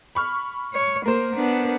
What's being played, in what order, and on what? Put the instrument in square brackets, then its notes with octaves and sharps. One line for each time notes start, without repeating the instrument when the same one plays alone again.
[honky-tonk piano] B5 C#6 F6
[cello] C#5
[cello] A#3 [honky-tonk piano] A#4 C5
[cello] B3 D4